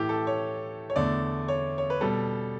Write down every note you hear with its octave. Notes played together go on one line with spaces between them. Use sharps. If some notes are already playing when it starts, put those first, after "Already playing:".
Already playing: A2 E3 A3 G4
A4
C#5
C#5
E2 D3 A3 D5
C#5
C#5
B4
B2 G3 A4